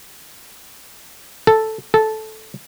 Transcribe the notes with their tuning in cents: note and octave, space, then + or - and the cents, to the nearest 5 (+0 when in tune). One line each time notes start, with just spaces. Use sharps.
A4 +0
A4 -10